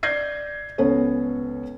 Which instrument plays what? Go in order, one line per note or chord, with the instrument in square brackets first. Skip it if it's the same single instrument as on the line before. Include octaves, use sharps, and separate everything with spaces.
[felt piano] D5 G6 G#6 A#6 C7
C#2 B3 C#4 A4 C#5